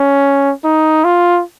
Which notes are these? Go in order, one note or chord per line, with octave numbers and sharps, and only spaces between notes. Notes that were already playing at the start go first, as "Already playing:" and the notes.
Already playing: C#4
D#4
F4